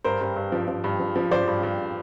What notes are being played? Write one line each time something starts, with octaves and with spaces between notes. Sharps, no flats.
G2 A#4 C5
G2
G2
F3
F3
G2
F3
F3
F3 C5 D5
G2
G2